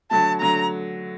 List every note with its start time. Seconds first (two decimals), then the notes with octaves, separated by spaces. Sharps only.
0.11 D3 F#3 A3 A5
0.40 D3 F#3 A3 A#5